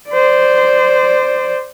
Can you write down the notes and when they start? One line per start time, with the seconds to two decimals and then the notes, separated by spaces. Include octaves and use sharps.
0.10 C5 D5